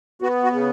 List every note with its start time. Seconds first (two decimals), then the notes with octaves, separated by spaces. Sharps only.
0.22 B3 F#4
0.43 F#4
0.52 C#3